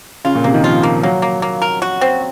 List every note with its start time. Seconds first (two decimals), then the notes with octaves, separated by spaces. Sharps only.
0.25 C#3 F4
0.35 A#2
0.44 C3 A#3
0.54 D#3
0.64 F3 F4
0.83 A#3
1.03 F#3 A#3
1.22 A#3
1.42 A#3
1.62 A#4
1.82 F#4
2.01 C4